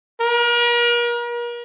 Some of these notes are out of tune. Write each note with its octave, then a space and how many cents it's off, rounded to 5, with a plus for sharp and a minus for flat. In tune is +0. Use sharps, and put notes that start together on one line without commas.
A#4 +40